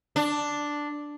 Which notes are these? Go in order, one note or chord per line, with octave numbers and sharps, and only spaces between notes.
D4